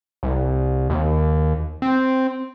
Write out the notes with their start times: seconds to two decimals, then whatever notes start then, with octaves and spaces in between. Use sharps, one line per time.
0.23 C2
0.90 D#2
1.82 C4